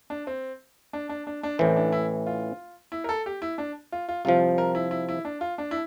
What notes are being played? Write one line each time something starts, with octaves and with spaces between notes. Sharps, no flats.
D4
C4
D4
D4
D4
D4
A1 A2 E3 C4
D4
E4
F4
E4
A#4
A4
G4
E4
D4
F4
F4
C2 C3 F3 F4
A#4
E4
E4
E4
D4
F4
D4
E4